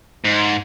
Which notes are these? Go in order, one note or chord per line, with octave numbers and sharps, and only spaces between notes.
G#2